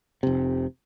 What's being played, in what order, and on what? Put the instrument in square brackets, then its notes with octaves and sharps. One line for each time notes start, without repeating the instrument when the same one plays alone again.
[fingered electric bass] F1 C3